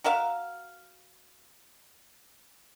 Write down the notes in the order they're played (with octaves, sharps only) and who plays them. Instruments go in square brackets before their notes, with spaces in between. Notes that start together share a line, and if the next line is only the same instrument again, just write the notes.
[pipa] F#4 A#4 E5 F5